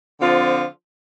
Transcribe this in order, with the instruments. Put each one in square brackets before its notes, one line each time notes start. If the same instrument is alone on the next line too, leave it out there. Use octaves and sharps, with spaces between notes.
[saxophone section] D3 F3 C4 F4